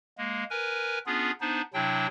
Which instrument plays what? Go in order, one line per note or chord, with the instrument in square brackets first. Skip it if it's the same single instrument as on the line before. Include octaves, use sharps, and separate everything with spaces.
[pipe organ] G#3 A#3
A#4 B4 G#5
B3 C#4 D4 F4 G#4
B3 D4 D#4 C5
C3 F#3 D4 E4 G5